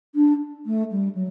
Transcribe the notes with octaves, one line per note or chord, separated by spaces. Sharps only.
D4
A3
G3
F#3